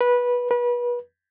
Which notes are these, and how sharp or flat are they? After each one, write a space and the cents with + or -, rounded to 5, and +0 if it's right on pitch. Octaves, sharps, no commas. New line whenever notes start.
B4 -15
B4 -30